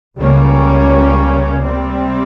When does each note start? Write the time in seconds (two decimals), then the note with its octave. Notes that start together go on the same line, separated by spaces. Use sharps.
0.17 C#2 C#3 G3 A#3 C#4
1.61 C3 G3 C4